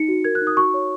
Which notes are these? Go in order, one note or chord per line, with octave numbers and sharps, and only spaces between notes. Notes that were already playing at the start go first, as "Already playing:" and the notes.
Already playing: D#4 C#7
F#4
A#4 G#6
F#6
D#4
D#6
F#4 C#6
C#5